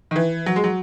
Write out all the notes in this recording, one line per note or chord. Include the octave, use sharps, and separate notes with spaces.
D#3
E3
F#3
G#3
F#3